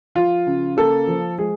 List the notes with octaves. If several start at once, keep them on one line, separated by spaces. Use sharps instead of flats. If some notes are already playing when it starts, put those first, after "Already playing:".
F3 F4
C#3
A#3 A4
F3
G#3 G#4